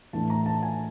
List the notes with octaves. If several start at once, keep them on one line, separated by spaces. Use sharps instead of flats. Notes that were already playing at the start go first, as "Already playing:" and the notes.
A2 E3 A3 D4 A5
A#5
A5
G#5